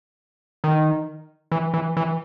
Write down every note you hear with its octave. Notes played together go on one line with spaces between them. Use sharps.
D#3
E3
E3
E3